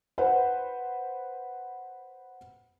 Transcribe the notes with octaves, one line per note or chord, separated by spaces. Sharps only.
B4 C5 F#5